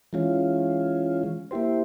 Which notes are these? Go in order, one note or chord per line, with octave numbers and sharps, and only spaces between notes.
E3 G#3 C#4 F4
A#3 E4 G4 C5